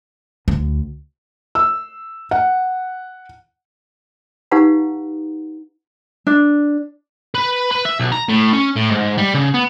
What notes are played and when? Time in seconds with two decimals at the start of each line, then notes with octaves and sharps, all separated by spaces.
0.48 D2
1.55 E6
2.31 F#5
4.51 D#4 G4 B4 F5 F#5 A#5
6.27 D4
7.35 B4
7.71 B4
7.85 E5
8.00 B1
8.12 A#5
8.29 A2
8.53 C#4
8.76 A2
8.90 G#2
9.18 G3
9.34 C#3
9.54 B3